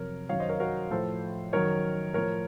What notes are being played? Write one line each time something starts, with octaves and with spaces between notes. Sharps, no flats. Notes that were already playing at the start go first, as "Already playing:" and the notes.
Already playing: F2 C3 F#3 A#4 C#5
F#2 D#3 F#3 C#5 F5
C5 D#5
A#4 C#5
F#4 A#4
A2 F3 A4 C5
F#2 D#3 F#3 A#4 C#5
A2 F3 A#4 C#5